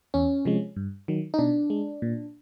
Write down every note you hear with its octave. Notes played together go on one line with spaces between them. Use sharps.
E2 C#4
C3 F3 G#3
G2
D#3 F#3
D#4
B2 D4
G#3
A#2